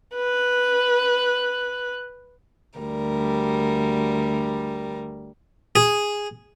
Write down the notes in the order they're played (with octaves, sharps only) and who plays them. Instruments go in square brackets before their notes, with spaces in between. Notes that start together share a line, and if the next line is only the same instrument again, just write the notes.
[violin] B4 F#6
[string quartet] D2 G3 A#4
[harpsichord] G#4